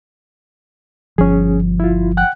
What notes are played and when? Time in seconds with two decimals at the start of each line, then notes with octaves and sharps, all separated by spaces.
1.18 G1 F3 C#4 G#4
1.80 E4 F4
2.17 F#5 G5 F#6